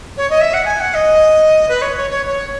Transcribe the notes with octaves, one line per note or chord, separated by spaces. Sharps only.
C#5
D#5
E5
F#5
G#5
F#5
D#5
B4
C#5
C#5
C#5
C#5